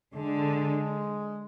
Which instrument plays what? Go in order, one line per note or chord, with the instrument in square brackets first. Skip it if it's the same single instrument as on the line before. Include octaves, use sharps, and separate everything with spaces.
[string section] D3 [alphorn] G#3